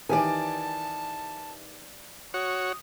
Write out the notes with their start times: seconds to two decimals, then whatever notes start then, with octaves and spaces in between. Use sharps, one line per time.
0.09 D#3 E3 G4 D5 G#5 A5
2.34 F#4 C#5 D#6